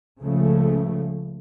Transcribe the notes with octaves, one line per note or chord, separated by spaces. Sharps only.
C#2 C#3 F3 A3